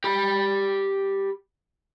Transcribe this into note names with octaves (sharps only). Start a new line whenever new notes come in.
G4 B5